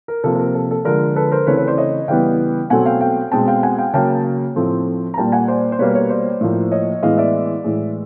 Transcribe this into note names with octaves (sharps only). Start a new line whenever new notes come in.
A#4
C3 F3 A#3 A4
A4
A#4
A4
A4
D3 F3 G#3 A#4
A4 B4
A#4 C5
C#3 E3 A3 C4 B4 C#5
B4 C#5
C5 D5
C#5 D#5
C#3 E3 G3 B3 F5 G5
B2 F#3 A3 C4 F#5 G#5
F5 G5
F5 G5
B2 G#3 C4 G5 A5
F5 G5
F#5 G#5
F5 G5
C#3 F#3 A#3 G5 A5
A2 F3 A3 C4
A#5
A#2 G3 A#3 G5 A5
F#5 G#5
C5 D5
C5
B2 G3 A#3 B4 C#5
B4 C#5
C5 D5
A2 F3 A#3
C#5 D#5
A2 E3 G#3 B3 D#5 F5
D5 E5
A2 E3 G#3